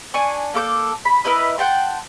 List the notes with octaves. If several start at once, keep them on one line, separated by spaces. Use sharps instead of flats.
D4 G#5 C#6
A#3 A4 D6 G6
B5
E4 A#4 B4 D#5
F#5 G5 A5 C6